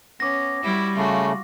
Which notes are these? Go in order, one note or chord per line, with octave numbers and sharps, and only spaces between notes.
B3 C#4 D6 A#6
G3 E4 F#4
C#3 A3 F4 F#4